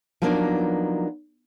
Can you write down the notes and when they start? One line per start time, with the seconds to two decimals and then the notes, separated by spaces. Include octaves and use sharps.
0.22 F3 F#3 A#3 B3 D4 D#4